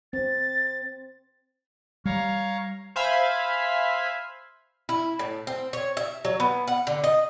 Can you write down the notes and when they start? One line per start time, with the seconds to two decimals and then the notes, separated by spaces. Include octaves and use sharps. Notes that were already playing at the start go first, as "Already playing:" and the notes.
0.13 C4 A6
2.06 G3 C#5 F5 A#5
2.96 C5 E5 F5 G#5 B5
4.89 E4
5.19 A2
5.47 C4
5.73 C#5
5.97 E5
6.25 F#3
6.40 B3
6.67 F#5
6.87 D3
7.04 D#5